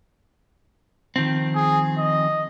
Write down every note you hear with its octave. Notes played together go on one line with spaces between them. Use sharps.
D#3 F3 C4
G#4
D#5